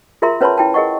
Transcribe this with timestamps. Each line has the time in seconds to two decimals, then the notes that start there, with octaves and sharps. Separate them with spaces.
0.22 F4 G#4 A#4 E5 A#5 C6
0.41 C#4 B4 C#5 A5 B5 C6
0.58 E4 G5 A5
0.74 G#4 A#4 D#5 F#5 C#6